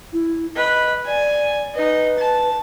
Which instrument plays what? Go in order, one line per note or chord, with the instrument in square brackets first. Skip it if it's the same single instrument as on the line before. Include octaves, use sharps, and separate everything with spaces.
[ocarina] E4
[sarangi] B4 [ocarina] D#5
[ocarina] D5 [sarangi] G#5
[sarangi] D#4 [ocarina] B4
[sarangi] A5